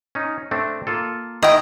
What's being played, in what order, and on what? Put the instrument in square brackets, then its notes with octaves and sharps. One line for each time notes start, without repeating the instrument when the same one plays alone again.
[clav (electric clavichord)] C#4 D#4
A3 C4 D4
A#3 F4 A4
[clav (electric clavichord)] D#3 E4 [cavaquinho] D#5 G5